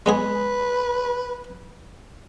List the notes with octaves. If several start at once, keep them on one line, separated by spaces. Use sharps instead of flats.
G#3 B3 G#4 B4